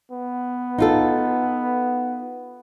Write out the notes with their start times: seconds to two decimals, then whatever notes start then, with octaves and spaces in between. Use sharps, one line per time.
0.12 B3
0.79 D#4 F4 A4